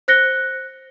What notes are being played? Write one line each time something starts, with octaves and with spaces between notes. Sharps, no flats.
C5 F#6 A#6 C#7 G7